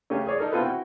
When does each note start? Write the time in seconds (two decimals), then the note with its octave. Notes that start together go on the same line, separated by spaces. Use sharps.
0.10 C#3 A3 C#4 G4
0.27 G#4 C#5 D5
0.38 D#4 A4 A#4 D5
0.52 B3 C4 E4 F4 A4 B4
0.64 E4 F#4 G5